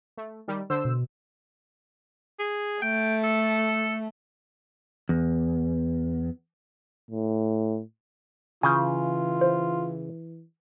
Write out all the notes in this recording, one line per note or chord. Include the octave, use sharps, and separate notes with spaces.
A3
D#3 G3
D3 C5 E6
B2
G#4
A3 G5
A4
E2
A2
C#3 E3 F4 G#5 G6
C5